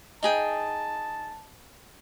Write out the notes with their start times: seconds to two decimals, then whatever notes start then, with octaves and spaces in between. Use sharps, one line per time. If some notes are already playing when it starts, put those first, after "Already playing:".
0.23 D#4 G#4 G5 A5